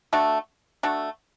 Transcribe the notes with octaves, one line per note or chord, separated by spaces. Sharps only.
A3 D4 F#4 A4
A3 D4 F#4 A4